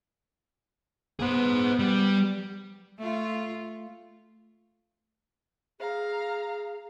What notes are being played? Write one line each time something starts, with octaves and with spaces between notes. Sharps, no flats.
B3 G#4 C5
G3
A3 F4
G#4 F5 A#5